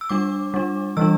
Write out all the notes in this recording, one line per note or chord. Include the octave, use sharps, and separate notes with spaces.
E6
G3 D4 D6
G3 D4
E3 G3 D4 E6